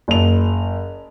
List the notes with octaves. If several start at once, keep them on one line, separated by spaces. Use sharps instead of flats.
F#1 F7